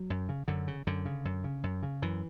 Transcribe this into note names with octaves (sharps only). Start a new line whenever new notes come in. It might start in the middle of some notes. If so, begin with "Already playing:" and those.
Already playing: F#3
F#2
C#3
F#2 D3
C#3
F#2 D3
C#3
F#2
C#3
F#2
C#3
F#2 E3